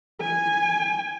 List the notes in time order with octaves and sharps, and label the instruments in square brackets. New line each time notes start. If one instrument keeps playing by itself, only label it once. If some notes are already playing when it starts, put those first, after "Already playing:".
[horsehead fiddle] G#5